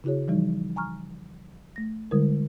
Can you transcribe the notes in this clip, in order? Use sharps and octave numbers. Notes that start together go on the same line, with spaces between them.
C#3 E4 F#4 G#4 C#5
E3 F3 G3 D#4
G#5 A#5 C#6 F6
A3 A#6
D3 G3 G#3 E4 A#4